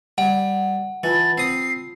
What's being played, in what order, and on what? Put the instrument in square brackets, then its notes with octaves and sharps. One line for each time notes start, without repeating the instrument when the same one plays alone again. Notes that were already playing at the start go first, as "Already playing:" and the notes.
[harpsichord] G3 [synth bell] F#5
[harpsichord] E3 [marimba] F4 A5 B5 [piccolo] A6
[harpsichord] C4 D#6 [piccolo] C7